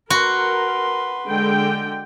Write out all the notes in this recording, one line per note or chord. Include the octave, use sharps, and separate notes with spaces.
F#4 A#4 B4 C6
D3 G#3 G5